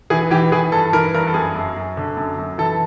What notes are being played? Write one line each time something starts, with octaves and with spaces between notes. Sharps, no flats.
E3 G#4
E3 G4
E3 G#4
G2 A4
E3 A#4
G2 A#4
A4
F#2 G#4
F#2
F#2
D3
F#2
F#2
E3 A4